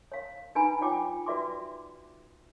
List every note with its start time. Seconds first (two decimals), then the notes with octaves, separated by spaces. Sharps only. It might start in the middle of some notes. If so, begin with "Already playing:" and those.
0.12 C#5 F5
0.55 D4 D#4 B4 G#5 A#5 B5
0.81 D4 F4 C#5 F#5 G5 D6
1.26 F#4 B4 D5 E5 C6 D6